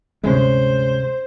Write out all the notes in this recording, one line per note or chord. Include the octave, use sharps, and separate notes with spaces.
D2 G2 C3 G#3 C#4 C5